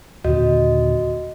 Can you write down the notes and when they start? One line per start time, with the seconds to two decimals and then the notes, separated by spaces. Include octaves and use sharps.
0.24 D#2 A#2 D3 F#4 D#5